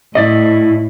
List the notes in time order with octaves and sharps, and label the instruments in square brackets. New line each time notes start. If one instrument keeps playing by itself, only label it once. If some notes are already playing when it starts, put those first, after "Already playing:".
[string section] A2 [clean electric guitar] E4 D5 D#5